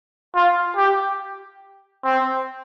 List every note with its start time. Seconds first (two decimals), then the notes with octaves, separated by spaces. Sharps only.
0.35 F4
0.76 G4
2.04 C4